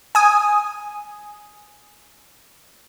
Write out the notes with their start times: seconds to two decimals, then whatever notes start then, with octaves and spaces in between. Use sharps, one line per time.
0.15 G#5 D#6